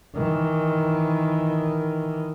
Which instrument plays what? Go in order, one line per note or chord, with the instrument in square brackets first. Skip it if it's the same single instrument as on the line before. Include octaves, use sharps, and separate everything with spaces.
[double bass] D#3 E3